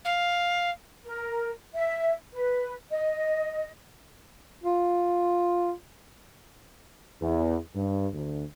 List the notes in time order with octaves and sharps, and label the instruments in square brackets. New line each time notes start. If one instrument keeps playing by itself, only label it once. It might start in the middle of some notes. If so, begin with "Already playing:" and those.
[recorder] F5
[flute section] A#4
E5
B4
D#5
[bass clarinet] F4
[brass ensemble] E2
G2
D2